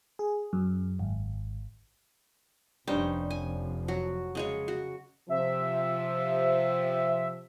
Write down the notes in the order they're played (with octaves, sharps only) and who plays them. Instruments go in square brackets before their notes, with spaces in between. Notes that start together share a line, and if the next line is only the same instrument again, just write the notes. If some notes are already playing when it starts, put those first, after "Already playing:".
[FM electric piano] G#4
F#2
G#1
[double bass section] F1 F3 [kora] G2 G3 D#4 [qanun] C#4 C5
[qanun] G#5
[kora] F#3 [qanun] F#4
[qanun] C#3 G#3 C#5
F#4
[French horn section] C3 F3 [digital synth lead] E5